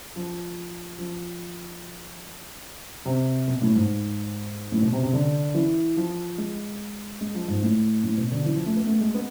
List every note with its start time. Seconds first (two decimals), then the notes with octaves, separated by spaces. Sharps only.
0.16 F3
0.99 F3
3.06 C3
3.48 B2
3.62 A2
3.75 G#2
4.72 A2
4.82 B2
4.93 C3
5.03 C3
5.13 D3
5.55 E3
5.97 F3
6.38 G#3
7.21 G#3
7.35 F3
7.48 G#2
7.62 A2
8.04 A2
8.18 B2
8.32 D3
8.45 E3
8.56 F3
8.66 A3
8.76 B3
8.87 A3
9.01 G#3
9.15 B3